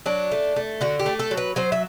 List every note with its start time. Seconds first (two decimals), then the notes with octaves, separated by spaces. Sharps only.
0.06 F#3 D4
0.32 A3
0.56 A3
0.81 D3 F#4
0.99 G4
1.06 A3
1.19 A4
1.31 F#3
1.37 B4
1.56 F#3 C5
1.72 E5